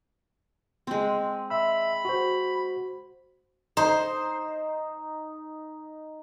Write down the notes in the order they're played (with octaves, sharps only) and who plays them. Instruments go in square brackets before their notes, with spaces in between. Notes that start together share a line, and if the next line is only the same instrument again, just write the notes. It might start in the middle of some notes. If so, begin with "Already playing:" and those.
[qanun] G#3 C4
[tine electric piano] E5 E6 [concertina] B5
[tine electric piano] F#4 C5
[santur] D#4 [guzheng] C5